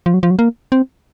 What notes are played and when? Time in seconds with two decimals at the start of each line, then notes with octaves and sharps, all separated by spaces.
0.06 F3
0.14 F#3
0.23 F3
0.31 F#3
0.39 A#3
0.72 C4